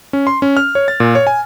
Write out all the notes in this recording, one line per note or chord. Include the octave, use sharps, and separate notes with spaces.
C#4
C6
C#4
F6
C#5
A6
A#2
C#5
G#5